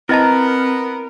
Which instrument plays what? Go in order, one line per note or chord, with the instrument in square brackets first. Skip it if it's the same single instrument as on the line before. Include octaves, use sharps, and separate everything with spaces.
[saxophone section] B3 [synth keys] C4 A#5 [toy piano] E4 D#5 A5 [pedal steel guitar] A#4